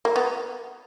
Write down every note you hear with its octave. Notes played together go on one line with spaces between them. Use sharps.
A#3
B3